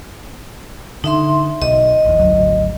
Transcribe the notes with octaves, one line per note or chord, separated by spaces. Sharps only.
D3 D#4 E5 C6
B1 D#5
A#1 E2
G#1 D2 F#3